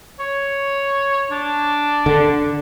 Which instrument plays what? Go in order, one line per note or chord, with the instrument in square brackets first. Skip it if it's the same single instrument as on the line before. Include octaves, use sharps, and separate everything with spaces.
[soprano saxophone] C#5
D4
[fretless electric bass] D3